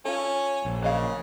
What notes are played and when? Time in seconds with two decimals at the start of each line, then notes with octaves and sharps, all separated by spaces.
0.05 C#4 F4 A4
0.65 A#1
0.82 C#3 F#3 D#5 F5